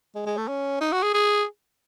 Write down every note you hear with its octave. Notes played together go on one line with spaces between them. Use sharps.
G#3
G#3
A3
C#4
D#4
F#4
G#4
G#4